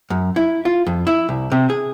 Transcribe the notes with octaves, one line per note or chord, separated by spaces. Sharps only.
F#2
E4
F4
F2
E4
C2
C3
G#4